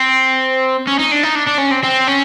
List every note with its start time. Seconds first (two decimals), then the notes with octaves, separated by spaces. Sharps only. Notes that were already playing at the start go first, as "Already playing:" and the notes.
Already playing: C4
0.87 C#4
0.99 D#4
1.12 D4
1.23 D#4
1.36 D4
1.47 D4
1.59 C#4
1.71 C4
1.83 C4
2.07 C#4